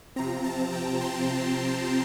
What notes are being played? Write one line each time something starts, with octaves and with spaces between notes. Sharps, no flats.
C3 F3 C4 A#5
A5
G5
C6